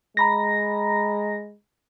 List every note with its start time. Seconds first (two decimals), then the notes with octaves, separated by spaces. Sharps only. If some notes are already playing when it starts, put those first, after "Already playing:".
0.17 G#3 A#5 B5 A#6